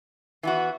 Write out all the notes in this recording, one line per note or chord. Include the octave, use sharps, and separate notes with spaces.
E3 B3 F#4